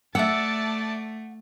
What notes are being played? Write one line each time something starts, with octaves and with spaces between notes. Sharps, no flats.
A3 D5 E5 F#5 A5 E6